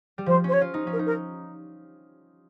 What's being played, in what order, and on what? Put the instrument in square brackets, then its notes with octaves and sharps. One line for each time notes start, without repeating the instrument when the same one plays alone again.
[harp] G3
[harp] F3 [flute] C5
[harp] C#4 [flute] C5
[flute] C#5
[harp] F4
D#4
C#4
[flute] A#4
[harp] D#4
[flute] A#4